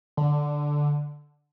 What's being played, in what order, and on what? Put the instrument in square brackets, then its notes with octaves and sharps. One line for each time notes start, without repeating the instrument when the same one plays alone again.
[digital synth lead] D3